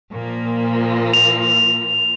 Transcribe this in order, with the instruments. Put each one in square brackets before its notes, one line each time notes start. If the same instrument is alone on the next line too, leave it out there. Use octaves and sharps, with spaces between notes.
[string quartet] A#2 F3 A#3
[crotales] F7